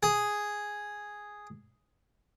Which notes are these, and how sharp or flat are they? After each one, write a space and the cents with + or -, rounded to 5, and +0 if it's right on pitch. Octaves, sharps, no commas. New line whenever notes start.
G#4 +0